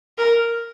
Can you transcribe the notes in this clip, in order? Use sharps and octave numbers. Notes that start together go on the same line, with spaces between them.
A#4